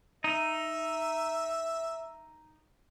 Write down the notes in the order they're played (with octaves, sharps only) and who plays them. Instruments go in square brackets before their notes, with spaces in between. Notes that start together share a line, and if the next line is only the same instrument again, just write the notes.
[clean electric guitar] D#4 [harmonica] E5